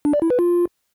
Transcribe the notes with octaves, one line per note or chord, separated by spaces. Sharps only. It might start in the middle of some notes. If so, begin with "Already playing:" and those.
D4
D5
E4
B4
F4